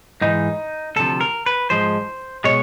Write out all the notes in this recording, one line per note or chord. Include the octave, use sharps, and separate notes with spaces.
G#2 E3 G#3 D#4
D2 C3 F3 A4
A#4
B4
G#2 F3 G#3 C5
B2 G#3 C#5